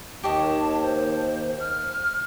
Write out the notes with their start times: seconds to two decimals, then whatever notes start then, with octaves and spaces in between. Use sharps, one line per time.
0.23 D#2 G4 C#5 D#5 A5
0.82 C5
1.60 F6